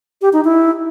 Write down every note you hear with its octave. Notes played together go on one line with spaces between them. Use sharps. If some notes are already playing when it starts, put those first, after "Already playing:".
G4
D#4
E4